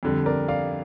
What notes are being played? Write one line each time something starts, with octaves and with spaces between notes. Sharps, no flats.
F2 D3 G3
A#4 D5
D5 F5